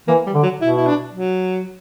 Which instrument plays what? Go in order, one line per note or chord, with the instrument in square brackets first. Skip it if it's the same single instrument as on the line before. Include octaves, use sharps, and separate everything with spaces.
[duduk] E3 [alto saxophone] A#3
[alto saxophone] G3
[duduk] D3
[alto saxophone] F#3
[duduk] B2 [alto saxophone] E4
[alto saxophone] E4
D4
F#3